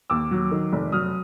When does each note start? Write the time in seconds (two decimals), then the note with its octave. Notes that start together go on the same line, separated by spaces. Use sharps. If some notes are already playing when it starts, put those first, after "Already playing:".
0.10 D#2 D6 E6
0.31 F#3
0.51 D#3
0.72 F1
0.92 F#3 D#6 F6